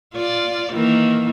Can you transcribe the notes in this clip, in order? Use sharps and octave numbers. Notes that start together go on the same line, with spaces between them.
F4 D5
D#3 E3 A#3